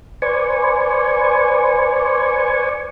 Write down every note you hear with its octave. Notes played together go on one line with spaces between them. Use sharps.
B4 C5 D5 G#5 C#6